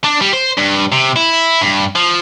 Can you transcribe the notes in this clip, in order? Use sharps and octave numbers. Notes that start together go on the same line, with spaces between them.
D4
G3
C5
G2
C3
E4
G2
F3